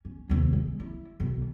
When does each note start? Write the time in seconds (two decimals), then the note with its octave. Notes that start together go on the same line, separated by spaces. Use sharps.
0.05 C#4
0.29 D#2 C3
0.53 G#3
0.80 E4
1.20 B1 D#3